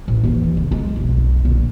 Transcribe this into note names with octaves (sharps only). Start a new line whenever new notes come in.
A1
D#2 E3
C#3
G#3
F1 B1
A#1 D3